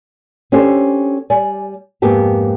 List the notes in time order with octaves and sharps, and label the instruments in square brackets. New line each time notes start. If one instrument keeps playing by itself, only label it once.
[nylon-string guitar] C#4 D4 G4 A4 C5
G3 D5 G#5
F2 G#2 A#3 B3 G4 A5